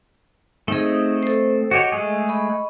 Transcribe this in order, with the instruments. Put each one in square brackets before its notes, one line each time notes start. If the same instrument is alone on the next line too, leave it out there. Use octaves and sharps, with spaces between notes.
[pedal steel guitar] A3 C4 D#5 [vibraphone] D#4 G#4
[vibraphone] A4 C5
[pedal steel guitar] F#4 G4 C#5 [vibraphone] D#5
[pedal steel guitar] G#3 A3 G#4
[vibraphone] D#5 B5 C#6